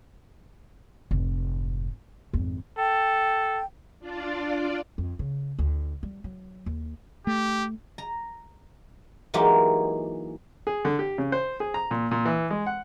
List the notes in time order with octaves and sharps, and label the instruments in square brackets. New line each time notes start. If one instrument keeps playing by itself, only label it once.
[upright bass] F1 G#2
G#1 F2
[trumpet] A4 [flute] G5
[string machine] D4 F4 D5
[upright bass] F2
C#3
D2
G3
F#3
D#2
[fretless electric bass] A3 [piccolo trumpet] G4
[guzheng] A#5
E3 F#3 G#3 A#3 D#4 G4
[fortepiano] G#4
D3
G4
C#3
C5
G#4
A#5
A#2
A#2
E3
G#3
F#5